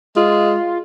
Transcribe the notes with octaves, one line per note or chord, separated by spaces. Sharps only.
G#3 F4